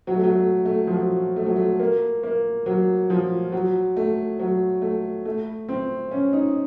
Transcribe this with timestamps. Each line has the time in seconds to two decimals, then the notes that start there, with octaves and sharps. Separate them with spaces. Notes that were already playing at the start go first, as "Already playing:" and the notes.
0.07 F#3
0.16 A3
0.24 F#3
0.36 A3
0.65 A3
0.87 F3
0.94 F#3
1.36 A3
1.46 F#3
1.56 A3
1.79 A#3
2.23 A#3
2.66 F#3
3.10 F3
3.52 F#3
3.97 A3
4.39 F#3
4.82 A3
5.25 A3
5.69 C4
6.11 C#4
6.33 D#4